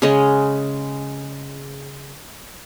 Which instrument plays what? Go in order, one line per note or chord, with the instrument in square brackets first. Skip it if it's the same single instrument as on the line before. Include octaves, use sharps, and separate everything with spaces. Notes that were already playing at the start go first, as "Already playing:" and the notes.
[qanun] C#3 G#3 C#5 D#5